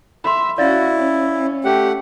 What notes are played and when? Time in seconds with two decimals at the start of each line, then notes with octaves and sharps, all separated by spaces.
0.24 E5 B5 C6
0.58 C#4 E4 F#4 D5 F5 A6
0.96 C#4
1.64 A3 G4 F#5